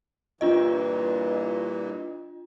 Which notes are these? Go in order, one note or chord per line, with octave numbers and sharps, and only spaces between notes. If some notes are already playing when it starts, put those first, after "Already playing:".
G2 A#2 E3 D4 F4 D#5